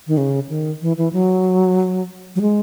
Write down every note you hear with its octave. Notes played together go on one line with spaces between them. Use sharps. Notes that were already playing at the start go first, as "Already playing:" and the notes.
D#3
C#3
D#3
E3
E3
F#3
F#3
G#3